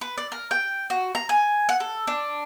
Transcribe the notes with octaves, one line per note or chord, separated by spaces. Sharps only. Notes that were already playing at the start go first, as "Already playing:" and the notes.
B4
D5
A#4
G5
F#4
A#5
G#5
F#5
A4
D4